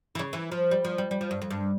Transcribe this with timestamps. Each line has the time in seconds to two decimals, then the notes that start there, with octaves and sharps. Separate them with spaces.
0.15 E3
0.19 C#3
0.33 E3
0.52 F3
0.71 G3
0.85 F3
0.98 G3
1.11 G3
1.21 F3
1.31 G2
1.42 F2
1.51 G2